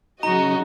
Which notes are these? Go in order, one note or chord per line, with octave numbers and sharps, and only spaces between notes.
C#3 F#3 D#4 F#4 D#5 A#5